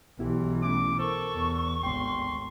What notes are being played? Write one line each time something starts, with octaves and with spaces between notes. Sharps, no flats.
B1 E3 B3 E4 G4
A3 C#4 E4 D6
A4 A#4 C5 C#6
E2
G#1 D2 B3 G5 C6